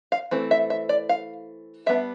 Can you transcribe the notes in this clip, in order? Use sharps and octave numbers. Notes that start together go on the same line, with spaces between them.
F5
E3 A3 C4
E5
E5
D5
F5
G3 B3 D4 E5